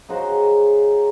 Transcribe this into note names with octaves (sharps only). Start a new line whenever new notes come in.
C#3 D#4 F#4 C5